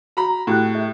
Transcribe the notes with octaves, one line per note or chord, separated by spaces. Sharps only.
F#4 A#5 B5
A2 F#4 G4 F#6
G#4 E5